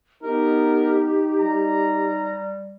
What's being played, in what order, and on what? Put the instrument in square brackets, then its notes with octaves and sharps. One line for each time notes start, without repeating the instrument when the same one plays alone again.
[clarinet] B3 [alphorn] D#4 [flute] G4 [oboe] A#4
[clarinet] G3 [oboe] A#5